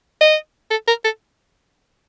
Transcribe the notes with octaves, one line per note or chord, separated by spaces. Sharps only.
D#5
A4
A#4
A4